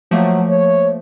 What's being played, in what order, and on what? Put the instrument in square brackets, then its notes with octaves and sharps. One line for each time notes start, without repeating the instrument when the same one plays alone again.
[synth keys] F3 A3 A#3 [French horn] F#3
[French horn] C#5